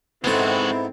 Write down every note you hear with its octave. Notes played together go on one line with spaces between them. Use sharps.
G#2 G#3 B3 C4 E4 F#4 A4